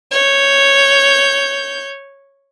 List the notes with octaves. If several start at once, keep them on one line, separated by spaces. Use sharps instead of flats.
C#5 G6